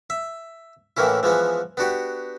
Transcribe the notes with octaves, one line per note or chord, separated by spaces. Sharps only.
E5
A2 E3 A#3 C#4 E4
E3 F3 G#3 B3
B3 D4 F#4 G4